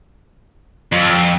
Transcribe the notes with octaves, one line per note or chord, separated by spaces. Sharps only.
F2